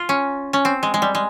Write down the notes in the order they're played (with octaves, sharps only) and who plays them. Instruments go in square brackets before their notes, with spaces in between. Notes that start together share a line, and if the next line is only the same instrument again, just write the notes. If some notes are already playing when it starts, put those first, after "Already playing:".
Already playing: [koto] F4
C#4
C#4
C4
G#3
G#3
G3
G#3